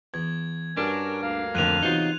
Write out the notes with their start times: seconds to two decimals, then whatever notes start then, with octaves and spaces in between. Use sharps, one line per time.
0.14 E2 G#6
0.77 G2 C#4 D4 F#4 A#4
1.22 D2 A#3 F5
1.55 F2 A2 D3 D#3 F#6 D#7 F7
1.83 E2 C3 F#3 D#4 F4